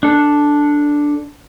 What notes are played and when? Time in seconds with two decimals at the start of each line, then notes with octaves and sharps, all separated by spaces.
0.03 D4 A4